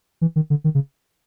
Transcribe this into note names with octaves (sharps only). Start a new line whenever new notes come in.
E3
D#3
D3
D#3
C#3